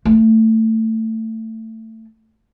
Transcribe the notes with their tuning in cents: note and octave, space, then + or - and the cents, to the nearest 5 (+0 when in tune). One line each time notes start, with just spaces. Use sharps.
A3 +20